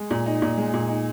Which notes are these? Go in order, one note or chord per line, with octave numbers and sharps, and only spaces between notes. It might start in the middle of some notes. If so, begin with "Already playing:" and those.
Already playing: G#3
A#2
D#4
A#2
G#3
A#2
D#4